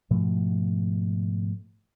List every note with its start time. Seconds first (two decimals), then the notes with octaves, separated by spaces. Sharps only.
0.10 G#2 B2 F3 A3